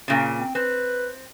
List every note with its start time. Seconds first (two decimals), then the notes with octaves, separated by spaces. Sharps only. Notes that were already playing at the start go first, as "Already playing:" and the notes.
0.08 A#2 C#3
0.38 C4
0.55 C4 B4